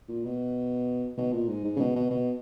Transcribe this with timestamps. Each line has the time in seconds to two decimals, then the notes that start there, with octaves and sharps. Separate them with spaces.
0.09 A#2
0.25 B2
1.18 B2
1.33 A#2
1.48 G#2
1.64 G#2
1.76 C#3
1.79 B2
1.96 B2
2.11 B2